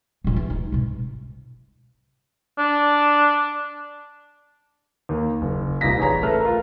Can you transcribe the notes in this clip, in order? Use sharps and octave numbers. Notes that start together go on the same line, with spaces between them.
E1 A#1
E3
D#4
G#2 B2
D4
D#2 A#3
F#1
D#1 C2 D#4 F4 A#6 B6
A1 G#4 C#5 A#5 B6
A3 A4 B4 F6
F4 A#4